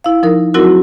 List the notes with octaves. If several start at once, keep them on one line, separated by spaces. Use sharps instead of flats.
E4 F5
F3 D#4 A#4
F#3 C4 E4 F#4 A#4